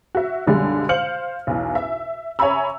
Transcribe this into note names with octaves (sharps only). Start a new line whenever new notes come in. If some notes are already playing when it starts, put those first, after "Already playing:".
F#4 E5
B1 F#2 D3 G3 G#3
C5 F5 F6 C#7 F#7
B1 E2
E5
C#5 E5 G#5 A#5 B5 E6